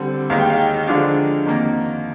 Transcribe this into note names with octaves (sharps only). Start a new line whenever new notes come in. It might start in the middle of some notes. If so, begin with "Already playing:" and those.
Already playing: D3 G3 C4
D#2 D#3 G#3 D#4 F5
G5
F5
D3 F3 G#3 D4 F5
F2 D#3 A#3